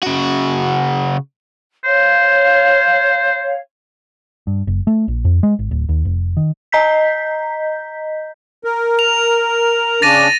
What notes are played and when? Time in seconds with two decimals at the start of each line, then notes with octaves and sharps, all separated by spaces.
0.03 C#3 F#4
1.84 C5 C#5 F5
4.47 G2
4.67 F#1
4.87 A3
5.08 A#1
5.25 F2
5.43 G#3
5.59 G#1
5.71 D1
5.89 D#2
6.05 F1
6.37 D#3
6.72 D#5 A#5 G6 B6
8.64 A#4
8.99 F7
10.02 C#3 D4 A6 A#6 D#7